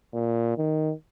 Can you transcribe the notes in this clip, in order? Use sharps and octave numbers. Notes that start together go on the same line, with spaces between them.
A#2
D#3